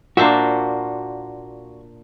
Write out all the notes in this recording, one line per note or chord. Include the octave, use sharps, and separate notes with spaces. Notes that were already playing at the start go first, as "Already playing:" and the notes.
A#2 A#3 D4 F#4 C5 E5